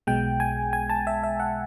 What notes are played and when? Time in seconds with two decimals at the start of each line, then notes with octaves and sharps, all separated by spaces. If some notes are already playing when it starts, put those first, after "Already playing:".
0.07 B1 B2 G#3 G5
0.40 G#5
0.73 G#5
0.90 A5
1.07 E5
1.23 E5
1.40 F#5